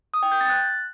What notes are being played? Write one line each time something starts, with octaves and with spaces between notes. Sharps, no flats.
D#6
G5
G6
A6
F#6